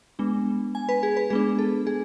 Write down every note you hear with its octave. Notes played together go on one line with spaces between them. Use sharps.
G#3 B3 D4
G#5
B4
G#4
B4
G#3 B3 D4 G#4
A4
G#4